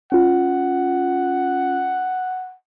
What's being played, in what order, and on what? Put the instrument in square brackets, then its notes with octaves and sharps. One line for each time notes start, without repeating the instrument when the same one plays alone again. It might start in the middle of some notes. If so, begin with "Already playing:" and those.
[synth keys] C#4 F4 [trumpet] F#5